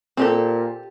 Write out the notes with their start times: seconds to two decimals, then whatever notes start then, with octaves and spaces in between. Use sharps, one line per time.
0.17 A#2 C4 G4 A4